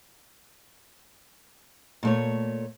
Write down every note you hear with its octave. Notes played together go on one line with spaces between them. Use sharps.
A#2 A3 C#5